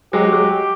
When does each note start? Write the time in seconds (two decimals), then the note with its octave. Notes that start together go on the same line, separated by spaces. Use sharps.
0.13 F#3 G#3 G4
0.32 F#3 G#3